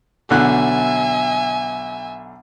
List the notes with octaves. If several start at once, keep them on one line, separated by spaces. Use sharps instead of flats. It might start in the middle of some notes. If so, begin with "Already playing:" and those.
B1 D3 E5 G#5 F#6